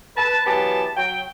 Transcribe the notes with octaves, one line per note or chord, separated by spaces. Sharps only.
B4 A5
E3 F#3 B3 G4 G#4 A5
F#3 G5